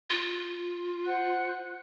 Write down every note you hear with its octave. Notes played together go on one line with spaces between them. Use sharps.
F4
C5 F#5 F#6